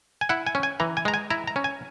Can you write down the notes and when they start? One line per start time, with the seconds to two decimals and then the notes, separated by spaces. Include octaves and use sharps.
0.21 G#5
0.29 E4 F#5
0.46 G#5
0.55 C#4
0.63 G#5
0.80 E3 A#5
0.97 G#5
1.05 G#3 A#5
1.14 G#5
1.30 E4 A#5
1.47 A#5
1.56 C#4
1.64 G#5